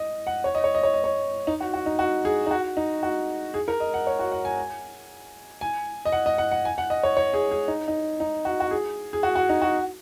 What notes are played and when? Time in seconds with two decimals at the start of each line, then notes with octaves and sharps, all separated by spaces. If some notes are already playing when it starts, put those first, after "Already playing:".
Already playing: D#5
0.27 F#5
0.44 C#5
0.55 D#5
0.64 C#5
0.75 D#5
0.83 C#5
0.94 D#5
1.04 C#5
1.47 D#4
1.60 F#4
1.74 F#4
1.86 D#4
1.99 F#4
2.25 G#4
2.46 D#4
2.51 F#4
2.77 D#4
3.03 F#4
3.54 G#4
3.68 A#4
3.80 D#5
3.94 F#5
4.07 C#5
4.19 F#4
4.32 F#5
4.45 G#5
5.61 G#5
6.05 D#5
6.12 F#5
6.26 D#5
6.38 F#5
6.51 F#5
6.65 G#5
6.78 F#5
6.90 D#5
7.03 C#5
7.17 C#5
7.34 G#4
7.51 G#4
7.68 D#4
7.88 D#4
8.20 D#4
8.45 F#4
8.60 F#4
8.71 G#4
9.13 G#4
9.23 F#4
9.36 F#4
9.49 D#4
9.62 F#4